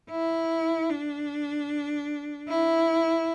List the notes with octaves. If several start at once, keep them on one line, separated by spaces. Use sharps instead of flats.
E4
D4
E4